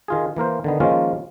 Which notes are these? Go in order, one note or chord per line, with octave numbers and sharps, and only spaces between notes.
D#3 F4 G#4
E3 A#3 A#4 C5
D3 D#3 B3
D#3 F3 G#3 A#3 C#4 F4